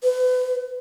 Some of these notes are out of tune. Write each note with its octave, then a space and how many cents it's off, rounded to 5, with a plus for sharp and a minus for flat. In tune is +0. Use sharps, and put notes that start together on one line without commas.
B4 +35